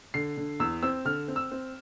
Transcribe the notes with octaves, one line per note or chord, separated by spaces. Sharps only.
D3 C7
D3
E2 E6
C4 E6
D3 F6
C4
E6
C4